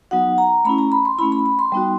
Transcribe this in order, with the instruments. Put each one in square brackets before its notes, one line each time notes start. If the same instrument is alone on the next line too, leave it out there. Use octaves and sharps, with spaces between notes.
[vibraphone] F#3 B3 D#4 F#4 F#5
A#5
A3 C#4 E4 B5
A#5
B5
C6
A3 C#4 E4 B5
B5
B5
C6
G3 B3 D#4 F#4